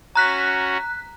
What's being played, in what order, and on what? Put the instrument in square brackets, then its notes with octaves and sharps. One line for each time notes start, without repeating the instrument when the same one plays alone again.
[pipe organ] C#4 F#4 [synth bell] A#5 F#6 B6